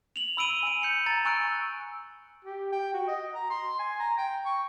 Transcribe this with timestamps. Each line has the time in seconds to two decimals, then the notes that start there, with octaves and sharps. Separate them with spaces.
0.16 F7 F#7
0.37 B5 E6 D7 D#7 G7
0.63 G#5 D7
0.82 G6 C#7 F#7
1.06 A#5 A6
1.25 G#5 C#6 E6 F#6 D7
2.45 G4
2.72 G5
2.93 F#4
3.07 D#5
3.34 A#5
3.50 C6
3.79 G#5
4.00 A#5
4.18 G5
4.45 C#6